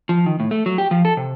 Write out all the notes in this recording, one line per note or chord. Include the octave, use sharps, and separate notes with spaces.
F3
D#3
A2
A3
F#3
G4
F3
A4
C3